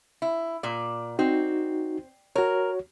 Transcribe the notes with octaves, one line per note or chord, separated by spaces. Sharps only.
E4
A#2 D5
C4 D#4 F#4
F#4 A#4 C#5